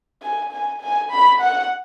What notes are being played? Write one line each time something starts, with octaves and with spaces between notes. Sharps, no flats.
G#5
G#5
G#5
B5
F#5